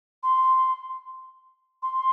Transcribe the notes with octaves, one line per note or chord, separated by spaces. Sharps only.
C6
C6